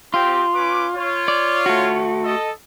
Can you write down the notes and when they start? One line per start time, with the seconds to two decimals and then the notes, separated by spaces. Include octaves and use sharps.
0.14 C4 F4 G4
0.54 C#4 B4 D6
0.95 F4 C#5
1.28 D5
1.66 A3 F#4
2.24 A4 D#5